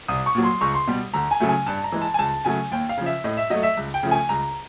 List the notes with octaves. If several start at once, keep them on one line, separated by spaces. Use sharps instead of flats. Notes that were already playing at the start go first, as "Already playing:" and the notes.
C2 D#6
C#6
A#2 F#3
C6
C#2 C#6
C6
B2 G3
D2 A#5
G#5
C#3 F#3 A3
G#5
G2 A5
A#5
E3 G#3
A5
G#5
C#2 A5
C#3 F#3 A3 G#5
D#2 G5
F5
C#3 F3
E5
A2 D#5
E5
F#3 A3 D#5
E5
C#2
G5
C#3 F3 A3
G#5
C#2 A#5